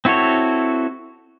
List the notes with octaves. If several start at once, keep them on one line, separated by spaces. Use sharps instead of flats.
C4 E4 F#4 A4 C#5